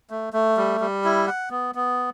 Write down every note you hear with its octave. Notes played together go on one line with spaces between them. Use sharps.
A3
A3
G3
G3
E4
F#5
B3
B3